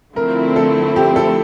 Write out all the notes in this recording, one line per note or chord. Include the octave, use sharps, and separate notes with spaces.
D3 F3 A3 C4 E4 A#4
A4
G4
A4